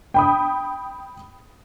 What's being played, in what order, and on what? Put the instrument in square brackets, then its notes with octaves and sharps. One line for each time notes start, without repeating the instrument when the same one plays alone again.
[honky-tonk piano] G5 B5 D#6